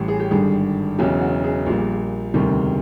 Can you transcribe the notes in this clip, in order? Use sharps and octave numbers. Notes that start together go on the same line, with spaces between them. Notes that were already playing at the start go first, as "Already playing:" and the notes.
Already playing: A1 A2 E3 G3
G#4
G4
G#1 G2 D3 G3 G#4
E1 E2 C#3 F#3 G4
F#4
G#4
A#1 A#2 G3
E1 D2 C3 D#3 G3